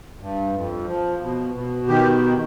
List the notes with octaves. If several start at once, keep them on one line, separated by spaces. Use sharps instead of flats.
G2
F2
F3
B2
B2
D#3 G4